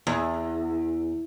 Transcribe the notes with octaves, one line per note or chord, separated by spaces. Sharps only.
E2